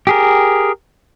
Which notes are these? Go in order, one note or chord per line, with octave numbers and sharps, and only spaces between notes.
G4 G#4 A#4